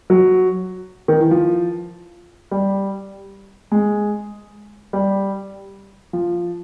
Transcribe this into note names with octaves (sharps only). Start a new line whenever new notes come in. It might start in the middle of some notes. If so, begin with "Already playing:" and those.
F#3
D#3
E3
F3
G3
G#3
G3
F3